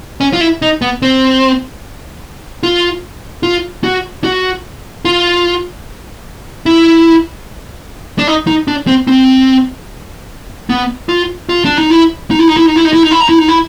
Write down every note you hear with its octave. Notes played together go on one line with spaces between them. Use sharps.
C#4
F4
E4
D#4
B3
C4
F4
F4
F#4
F#4
F4
E4
D4
D#4
D#4
D4
C4
C4
B3
F4
F4
D4
D#4
E4
D#4
E4
D#4
E4
D#4
E4
D#4
E4
D#4
E4
D#4
E4
D#4
E4